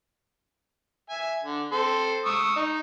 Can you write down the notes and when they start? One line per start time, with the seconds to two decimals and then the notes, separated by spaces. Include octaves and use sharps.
1.10 E5 G#5
1.43 D3
1.72 C4 A4 C6
2.26 C#6 D#6 E6
2.56 D#4